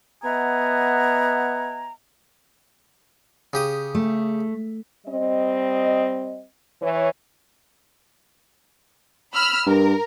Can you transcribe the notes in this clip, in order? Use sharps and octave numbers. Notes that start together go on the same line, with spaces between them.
B3 D#5 E5 F#5 G#5 A#5
C#3 G4 D#6
A3
G3 C4 D#5
E3 C#5
B5 E6 F6
G2 A#4